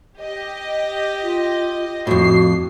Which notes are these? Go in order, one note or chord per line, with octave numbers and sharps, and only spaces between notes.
G4 D#5
F4
F2 A2 F#4 C7